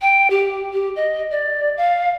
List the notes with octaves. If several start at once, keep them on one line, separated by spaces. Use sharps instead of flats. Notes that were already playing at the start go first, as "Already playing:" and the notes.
G5
G4
G4
D#5
D5
F5